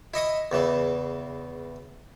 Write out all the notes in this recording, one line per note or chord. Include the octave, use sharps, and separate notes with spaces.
E4 D#5 C#6 D#6
E2 C#3 E3